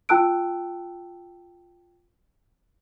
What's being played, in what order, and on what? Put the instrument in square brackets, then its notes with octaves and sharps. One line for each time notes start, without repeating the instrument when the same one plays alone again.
[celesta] F4 G5 A5 E6 F#6 D7